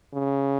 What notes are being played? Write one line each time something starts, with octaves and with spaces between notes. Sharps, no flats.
C#3